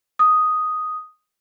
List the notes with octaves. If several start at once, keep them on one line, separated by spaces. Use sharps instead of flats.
D#6